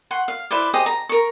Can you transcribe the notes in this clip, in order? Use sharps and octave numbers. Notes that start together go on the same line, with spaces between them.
F#5 C6 C#6
F5
E4 B4 C5 D5
G4 G#4 C5 D#5
A#5
A#4 C#6